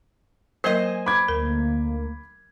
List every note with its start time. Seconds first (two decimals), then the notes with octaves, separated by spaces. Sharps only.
0.64 F#3 A#3 A#4 C5 D#5 G#5
1.06 B5 D6 G#6
1.28 D2 A#3 A#4